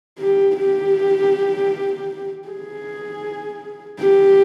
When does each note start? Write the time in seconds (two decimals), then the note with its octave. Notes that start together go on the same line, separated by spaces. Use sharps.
0.19 G4
0.57 G4
2.48 G#4
4.00 G4